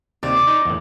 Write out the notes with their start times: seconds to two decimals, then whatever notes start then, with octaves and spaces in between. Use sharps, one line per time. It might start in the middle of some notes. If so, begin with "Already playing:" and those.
0.23 D#2 C3 D5
0.47 D#4
0.65 E2 A2